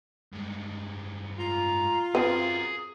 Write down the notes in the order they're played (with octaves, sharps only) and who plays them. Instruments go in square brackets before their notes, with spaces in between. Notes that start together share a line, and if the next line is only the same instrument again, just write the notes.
[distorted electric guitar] G2 G#3
[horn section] F4 [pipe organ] A#5
[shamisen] C4 B4 [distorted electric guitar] F#4 A#4 [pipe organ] G#4